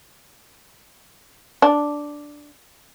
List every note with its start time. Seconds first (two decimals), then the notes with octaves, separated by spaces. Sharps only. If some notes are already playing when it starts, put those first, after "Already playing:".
1.62 D4